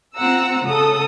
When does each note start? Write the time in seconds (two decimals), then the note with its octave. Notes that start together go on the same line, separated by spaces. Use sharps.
0.16 C4 F4 F#5 A#5 E6
0.68 C#3 A4 D#6